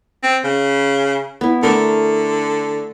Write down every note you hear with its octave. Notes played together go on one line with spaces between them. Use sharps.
C4
C#3
B3 E4
D3 A3 A#4